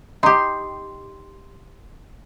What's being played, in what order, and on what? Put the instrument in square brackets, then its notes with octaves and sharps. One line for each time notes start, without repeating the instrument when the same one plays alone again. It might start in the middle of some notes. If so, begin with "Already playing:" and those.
[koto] D#4 G4 [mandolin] C6